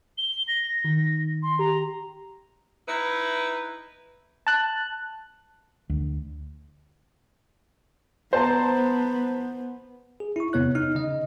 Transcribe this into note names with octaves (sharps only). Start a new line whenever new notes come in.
G7
A#6
D#3
C6
G4 A#5
D#4 E4 B4
A5 F#6
D2
B3 C5 A5 A#5
G#4
E4 C#6
E2 C3 B3 C#5 F#6
D#4 F6
C#3 D#5